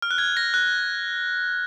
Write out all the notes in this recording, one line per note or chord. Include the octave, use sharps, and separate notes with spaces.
F6
F#6
G#6
A#6
F#6